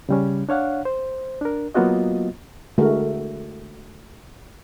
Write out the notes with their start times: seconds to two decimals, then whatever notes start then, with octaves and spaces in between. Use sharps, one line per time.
0.09 C#3 G3 C#4
0.49 D4 C#5 F5 F#5
0.85 C5
1.41 D4 A#4
1.75 F#3 A#3 B3 F4 F#4 D#5
2.78 D3 G#3 A3 F#4 A#4